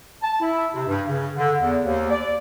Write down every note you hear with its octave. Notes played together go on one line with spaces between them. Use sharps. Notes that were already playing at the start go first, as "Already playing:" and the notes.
A5
E4
C3
G2
C#3
D3
E2
D#2
D5